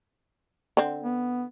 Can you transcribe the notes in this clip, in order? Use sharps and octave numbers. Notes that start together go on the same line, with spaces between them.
D3 C4
B3